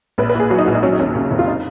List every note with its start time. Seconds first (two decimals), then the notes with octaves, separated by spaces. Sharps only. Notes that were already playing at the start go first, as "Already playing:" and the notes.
0.18 A#1 B4
0.29 B4
0.35 A#2 G#4
0.50 F#3 F#4
0.58 D#4
0.66 A#1 F#4
0.75 D#4
0.83 F#3 C#4
0.93 D#4
0.99 D#2 C#4
1.15 C#3
1.31 F1
1.39 F4
1.48 D#4